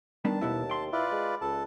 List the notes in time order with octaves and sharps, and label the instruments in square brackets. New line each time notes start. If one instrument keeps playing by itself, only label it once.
[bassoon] D#3 [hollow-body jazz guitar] G3 B3 D4 [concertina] A5
[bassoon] D#2 [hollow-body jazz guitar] B2 B3 E4
[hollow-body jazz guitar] G5 C6
[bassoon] E4 [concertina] F4 B4 D5
[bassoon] G#3
[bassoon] C#2 [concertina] A4 A5